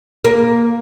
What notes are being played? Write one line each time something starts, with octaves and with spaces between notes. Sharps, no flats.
A#3